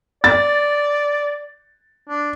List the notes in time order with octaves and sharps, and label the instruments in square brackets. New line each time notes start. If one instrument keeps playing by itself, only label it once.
[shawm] D5 [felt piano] A6
[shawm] D4